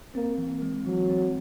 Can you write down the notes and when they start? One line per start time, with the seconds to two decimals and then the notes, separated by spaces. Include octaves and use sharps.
0.15 A#3 C4
0.38 E3
0.62 G#3
0.86 E3 F#3
1.09 C4